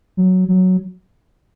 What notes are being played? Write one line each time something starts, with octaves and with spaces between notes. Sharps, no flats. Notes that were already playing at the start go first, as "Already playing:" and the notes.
F#3
F#3